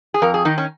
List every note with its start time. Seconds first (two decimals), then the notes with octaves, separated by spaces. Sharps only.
0.14 G#4
0.22 F2 A#4
0.34 G#4
0.45 D#3 D#4
0.58 C#4